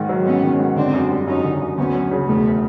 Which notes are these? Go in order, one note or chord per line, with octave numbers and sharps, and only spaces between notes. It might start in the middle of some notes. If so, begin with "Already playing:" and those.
Already playing: G#2 D#3
F#3
G#2 B3 C#4
D#3
G#2
D3 C4 D4
F#2
G3
F#2 C#4 D#4
D3
F#2
D2 B3 C#4
F#3
C#3
E1 A3 B3